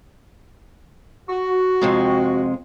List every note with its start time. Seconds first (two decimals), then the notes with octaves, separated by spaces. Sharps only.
1.30 F#4
1.81 F2 C3 G#3